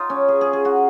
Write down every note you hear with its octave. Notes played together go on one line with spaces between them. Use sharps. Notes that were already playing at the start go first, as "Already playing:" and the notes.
Already playing: D#4 F4
C#4
G#4
G#4
G#4
F#4